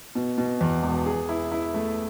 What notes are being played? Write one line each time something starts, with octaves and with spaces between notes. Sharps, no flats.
B2
B2
E2
E1
G#4
E4
E4
A3